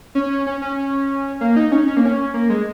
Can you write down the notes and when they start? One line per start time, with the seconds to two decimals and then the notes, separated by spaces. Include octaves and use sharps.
0.15 C#4
0.47 C#4
0.62 C#4
1.41 A#3
1.56 D#4
1.72 C#4
1.87 C#4
1.97 A#3
2.05 C#4
2.34 A#3
2.50 G#3